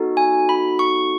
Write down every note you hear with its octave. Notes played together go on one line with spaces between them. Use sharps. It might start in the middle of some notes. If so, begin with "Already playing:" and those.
Already playing: B3 D#4 F#4 A4
G#5
B5
C#6